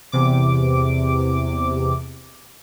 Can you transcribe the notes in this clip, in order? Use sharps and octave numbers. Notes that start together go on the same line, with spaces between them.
E2 C3 D6